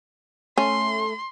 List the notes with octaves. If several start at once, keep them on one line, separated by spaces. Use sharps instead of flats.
A3 C#4 C6